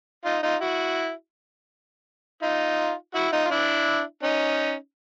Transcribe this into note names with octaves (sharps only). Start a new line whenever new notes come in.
D#4 F4
D#4 F4
E4 F#4
D#4 F4
E4 F#4
D#4 F4
F4
D4 E4
C#4 D#4